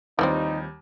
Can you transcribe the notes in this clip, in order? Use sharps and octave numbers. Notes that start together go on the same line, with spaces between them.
D#2 E3 F3 G3 C4 D#4